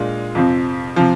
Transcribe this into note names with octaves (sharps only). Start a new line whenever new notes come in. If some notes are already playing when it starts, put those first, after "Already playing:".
Already playing: A#2 G#3 D4 F4
F2 C3 F3 C4
C3 F3